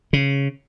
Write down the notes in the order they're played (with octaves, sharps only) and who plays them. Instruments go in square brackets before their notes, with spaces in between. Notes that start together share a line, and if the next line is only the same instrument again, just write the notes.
[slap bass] C#3